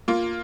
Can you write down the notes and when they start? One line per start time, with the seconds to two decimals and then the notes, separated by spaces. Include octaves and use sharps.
0.08 A#3 F4